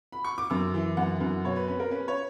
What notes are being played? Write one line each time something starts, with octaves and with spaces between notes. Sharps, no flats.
B5
C#6
D6
F#2 E6
E3
F#2 F#5
F#2
B2 C#5
B4
C#4 B4
A#4
C#4 B4
C#5